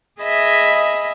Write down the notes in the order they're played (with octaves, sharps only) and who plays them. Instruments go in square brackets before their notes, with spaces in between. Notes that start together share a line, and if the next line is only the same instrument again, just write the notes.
[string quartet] G#4 D#5 E5 B5